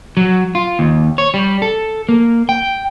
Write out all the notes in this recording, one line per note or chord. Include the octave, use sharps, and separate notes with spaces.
F#3
F4
D#2
C#5
G3
A4
A#3
G5